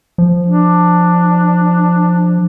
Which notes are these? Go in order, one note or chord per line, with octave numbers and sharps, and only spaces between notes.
F3
D4